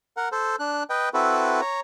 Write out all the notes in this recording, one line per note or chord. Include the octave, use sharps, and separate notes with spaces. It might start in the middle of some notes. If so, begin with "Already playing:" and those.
A#4 F#5
A4 C5
D4 F#6
B4 D#5 G5
C4 E4 F#4 A4 B4
C#5 A#5